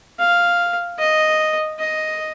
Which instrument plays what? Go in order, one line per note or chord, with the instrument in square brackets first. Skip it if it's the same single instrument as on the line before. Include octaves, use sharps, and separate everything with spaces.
[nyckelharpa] F5
D#5
D#5